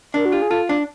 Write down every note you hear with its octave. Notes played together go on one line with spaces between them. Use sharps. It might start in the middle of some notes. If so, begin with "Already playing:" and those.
D4 A#4
F#4
F4 G4
G#4
F4 A4
D4